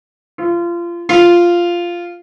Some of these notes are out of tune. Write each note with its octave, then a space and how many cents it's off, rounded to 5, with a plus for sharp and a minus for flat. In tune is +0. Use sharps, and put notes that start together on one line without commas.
F4 -25
F4 -5